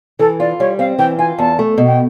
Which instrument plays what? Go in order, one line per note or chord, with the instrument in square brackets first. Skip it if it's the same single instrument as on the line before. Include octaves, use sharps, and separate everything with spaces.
[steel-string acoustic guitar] E3 [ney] A4
[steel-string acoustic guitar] F4 [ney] D5
[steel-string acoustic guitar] G3 [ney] C#5
[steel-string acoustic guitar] C4 [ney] F5
[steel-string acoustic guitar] E3 [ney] G5
[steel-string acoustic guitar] F4 [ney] G#5
[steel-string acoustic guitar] E2 [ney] A5
[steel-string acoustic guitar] A3
B2
[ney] G5